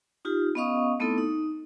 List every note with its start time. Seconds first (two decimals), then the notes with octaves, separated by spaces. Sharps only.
0.25 D#4 F4 G4
0.55 B3 C#4 D#5 F5 C#6 D#6
1.00 A3 B3 C4 D#4 E4 A4
1.18 D#4